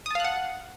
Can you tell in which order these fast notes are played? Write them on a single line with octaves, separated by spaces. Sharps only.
D#6 A5 F5 F#6 F#5